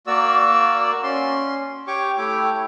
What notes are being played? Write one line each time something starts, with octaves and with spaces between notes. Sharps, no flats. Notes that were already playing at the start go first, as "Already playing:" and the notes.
A#3 F#4 D5 E6
C#4 C6
G4 C#5 C#6 D6
A3 E4 G4 C#5 D6